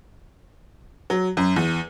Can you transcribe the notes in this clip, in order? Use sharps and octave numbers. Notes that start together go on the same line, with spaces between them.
F#3
F#2
E2